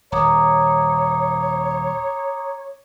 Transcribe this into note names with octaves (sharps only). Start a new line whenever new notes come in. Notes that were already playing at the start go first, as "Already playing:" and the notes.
D#1 C#5 A#5 D6 D#6